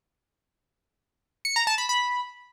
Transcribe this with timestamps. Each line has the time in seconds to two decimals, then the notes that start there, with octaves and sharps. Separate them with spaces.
1.45 C#7
1.56 A#5
1.67 A5
1.78 B5
1.89 B5